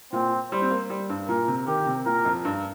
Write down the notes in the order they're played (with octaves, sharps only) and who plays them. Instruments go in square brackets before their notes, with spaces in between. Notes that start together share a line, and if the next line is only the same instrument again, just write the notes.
[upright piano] A#2 [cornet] C4
[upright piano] G3 [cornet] C5
[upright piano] C4
A#3
G3
G2
[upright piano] A#2 [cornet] A#4
[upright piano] C3
[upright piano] D#3 [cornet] G4
[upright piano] C3
[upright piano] A#2 [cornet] A#4
[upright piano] F2
G2